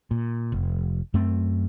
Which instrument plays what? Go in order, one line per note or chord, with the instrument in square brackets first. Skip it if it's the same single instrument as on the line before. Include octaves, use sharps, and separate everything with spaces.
[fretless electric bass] A#2
F1
F#2 A3 C4